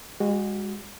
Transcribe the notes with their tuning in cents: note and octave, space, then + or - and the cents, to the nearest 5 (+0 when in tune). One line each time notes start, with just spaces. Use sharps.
G#3 -35 F#4 +0